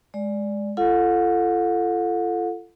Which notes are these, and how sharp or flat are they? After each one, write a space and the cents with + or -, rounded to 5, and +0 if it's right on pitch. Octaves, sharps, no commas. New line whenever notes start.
G#3 +0 D5 +0
F4 -35 A4 +0 F#5 -40